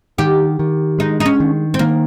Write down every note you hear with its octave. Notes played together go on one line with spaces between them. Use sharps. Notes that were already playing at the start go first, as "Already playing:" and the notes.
D#3 G4
D#3
G#3 D#4
D#4
C#4
D#3
C4
D#3 A#3